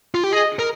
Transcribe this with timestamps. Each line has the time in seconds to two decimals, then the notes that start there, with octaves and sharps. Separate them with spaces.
0.15 F4
0.23 G4
0.33 G#4 D#5
0.59 A#4